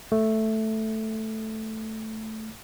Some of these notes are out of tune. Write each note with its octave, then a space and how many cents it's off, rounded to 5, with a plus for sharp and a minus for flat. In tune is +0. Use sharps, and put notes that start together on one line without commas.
A3 +0